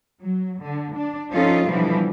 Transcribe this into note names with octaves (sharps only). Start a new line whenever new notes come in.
F#3
D3
D4
F3 C#4 D#4 F4 A4
B2 D3 E3 F3 G3